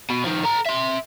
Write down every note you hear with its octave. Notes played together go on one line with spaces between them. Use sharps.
B2
D#3 F3
A4 A#5
E5 C6